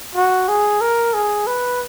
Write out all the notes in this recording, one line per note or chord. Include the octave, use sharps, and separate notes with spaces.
F#4
G#4
A#4
G#4
B4